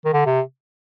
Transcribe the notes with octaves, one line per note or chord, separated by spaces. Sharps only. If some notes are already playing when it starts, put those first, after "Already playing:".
D#3
D3
C3